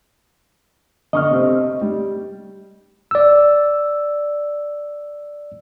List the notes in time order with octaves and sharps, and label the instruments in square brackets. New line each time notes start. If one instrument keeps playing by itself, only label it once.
[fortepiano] D3 C#6 F6 [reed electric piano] D#5
[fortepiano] C3 C4
G3
[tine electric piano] D5 E6